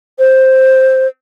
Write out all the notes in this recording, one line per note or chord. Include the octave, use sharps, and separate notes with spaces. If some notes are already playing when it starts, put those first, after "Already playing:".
C5